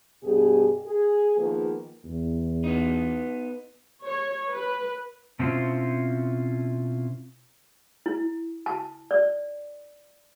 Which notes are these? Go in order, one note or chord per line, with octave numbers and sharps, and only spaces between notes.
G2 B2 G4 G#4
G#4
D#3 F3 A#3 B3 G#4 B4
E2
B3 D#4
C#5
B4
B2 C4 C#4 E4 F4 C5
E4
A5
D5